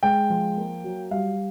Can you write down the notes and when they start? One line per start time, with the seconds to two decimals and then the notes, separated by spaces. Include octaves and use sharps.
0.03 G#3 G5
0.30 F3
0.57 A#3
0.84 F#3
1.11 G3 F5